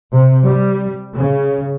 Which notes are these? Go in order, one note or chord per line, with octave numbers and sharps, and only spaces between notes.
C3
G3
C#3